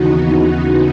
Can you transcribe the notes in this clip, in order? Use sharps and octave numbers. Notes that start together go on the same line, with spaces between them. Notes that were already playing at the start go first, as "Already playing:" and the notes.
Already playing: D#2 C#3 E3 B3 D#4 F#4
D#4 F#4